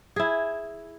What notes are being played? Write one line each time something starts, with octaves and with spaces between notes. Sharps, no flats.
E4 G#4